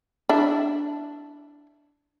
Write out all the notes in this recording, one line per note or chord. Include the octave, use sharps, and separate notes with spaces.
D4 E4